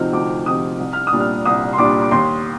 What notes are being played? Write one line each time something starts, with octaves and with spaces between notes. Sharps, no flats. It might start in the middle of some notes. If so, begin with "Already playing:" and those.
Already playing: D2 C3 F3 C4 D#4 F6
D2 D6
C3 F3 C4 D#4 D#6
C2
F6
D#6
A#2 G3 D4
F6
C2 D#6
C6
A#2 G3 D4 D6
D6
D#2 C6